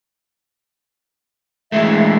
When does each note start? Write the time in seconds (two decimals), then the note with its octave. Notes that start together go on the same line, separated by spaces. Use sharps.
1.72 E3 G#3 A3 E5